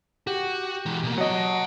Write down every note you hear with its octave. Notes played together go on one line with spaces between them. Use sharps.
F#4 G4
E3 G#3
B2 A#3
F#3 D#5 F#5 A5